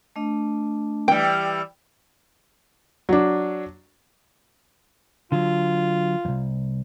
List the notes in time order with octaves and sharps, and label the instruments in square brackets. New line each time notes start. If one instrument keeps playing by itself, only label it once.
[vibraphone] A3 D4 D#5
[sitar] E3 G3 [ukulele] G5
[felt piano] F#3 D4
[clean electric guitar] D3 F#3 [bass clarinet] F4
[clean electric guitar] C2 F2